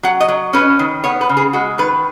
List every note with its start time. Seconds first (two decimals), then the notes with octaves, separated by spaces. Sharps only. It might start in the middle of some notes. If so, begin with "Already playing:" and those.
0.03 F#3 F#5
0.20 D#5
0.28 F#3
0.53 C#4 B4
0.79 D#3
1.04 B3 C#5
1.21 B4
1.29 C#3
1.37 G#4
1.53 G#3 F#4
1.78 D#3 B4